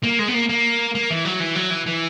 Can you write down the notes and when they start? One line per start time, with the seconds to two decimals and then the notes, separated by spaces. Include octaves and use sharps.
0.03 A#3
0.19 G#3
0.28 B3
0.34 A#3
0.49 A#3
0.95 A#3
1.10 E3
1.25 F#3
1.40 E3
1.55 F#3
1.71 E3
1.86 E3